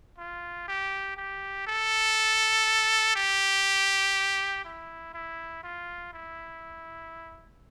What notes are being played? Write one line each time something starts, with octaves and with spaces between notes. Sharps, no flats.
F4
G4
G4
A4
G4
E4
E4
F4
E4